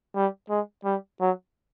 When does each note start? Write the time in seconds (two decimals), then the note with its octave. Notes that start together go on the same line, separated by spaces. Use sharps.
0.16 G3
0.49 G#3
0.85 G3
1.20 F#3